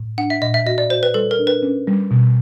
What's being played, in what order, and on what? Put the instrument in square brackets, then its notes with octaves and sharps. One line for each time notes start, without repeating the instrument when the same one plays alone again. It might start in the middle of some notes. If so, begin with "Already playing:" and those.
Already playing: [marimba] A2
[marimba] D4 [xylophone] F#5
[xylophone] E5
[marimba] A#2 [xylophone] D#5
[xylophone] E5
[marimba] F#4 [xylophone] D#5
[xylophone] D5
[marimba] F#4 [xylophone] C5
[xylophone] B4
[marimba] G3 [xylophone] A4
[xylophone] A#4
[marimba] D4
[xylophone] B4
[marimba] C#4
G3
B2